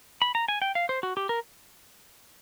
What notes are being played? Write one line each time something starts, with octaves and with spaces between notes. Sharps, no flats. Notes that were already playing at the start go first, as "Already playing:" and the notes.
B5
A#5
G#5
G5
F5
C5
F#4
G4
A#4